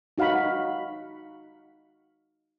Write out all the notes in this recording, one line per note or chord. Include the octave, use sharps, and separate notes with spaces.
D#4 F#4 F5 F#5 B5